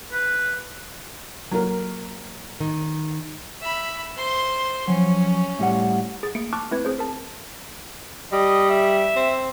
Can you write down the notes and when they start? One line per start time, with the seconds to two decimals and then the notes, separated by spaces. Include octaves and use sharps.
0.12 B4
1.51 F#3 A#3 A#4
2.60 D#3
3.61 E5 B5
4.17 C5 C6
4.88 F3 F#3 C#4
5.59 A2 G3 F#5
6.23 G#4 A6
6.35 A3 A#3 C#7 D7
6.53 A5 C#6 D6 F6 F#6
6.71 A3 C4 E4 B4 G#6
6.85 C4 G#4 C5
6.99 A#4 A5
8.33 G3 D#5
8.70 E5
9.16 C4